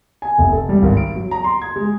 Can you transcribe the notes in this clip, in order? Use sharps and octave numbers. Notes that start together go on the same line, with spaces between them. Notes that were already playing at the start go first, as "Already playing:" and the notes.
G#5
F1
A4
G3
G#1
D7
F#3
A#5
C6
G#6
G#3